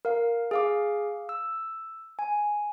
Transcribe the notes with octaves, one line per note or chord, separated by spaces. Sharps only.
A#4 F5
G#4 F5 D6
E6
G#5